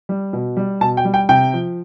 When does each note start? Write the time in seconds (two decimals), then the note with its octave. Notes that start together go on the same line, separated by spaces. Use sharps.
0.09 G3
0.33 B2
0.57 G3
0.81 B2 A5
0.97 G5
1.05 G3
1.14 G5
1.29 C3 G5
1.53 F3